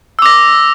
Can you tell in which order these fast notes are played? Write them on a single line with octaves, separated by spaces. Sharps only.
E6 D6 A#6